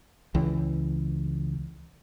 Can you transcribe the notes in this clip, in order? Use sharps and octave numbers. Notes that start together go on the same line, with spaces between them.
C#2 E3